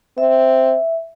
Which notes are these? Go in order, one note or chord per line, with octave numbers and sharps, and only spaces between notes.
C4 E5